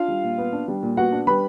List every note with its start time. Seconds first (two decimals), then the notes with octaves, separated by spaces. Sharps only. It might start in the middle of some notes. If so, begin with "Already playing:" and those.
Already playing: D4 F4 F5
0.08 G3
0.24 A#2
0.38 B3
0.53 D4
0.68 G3
0.83 A#2
0.97 B3 F#4 F#5
1.12 D4
1.27 G3 B4 B5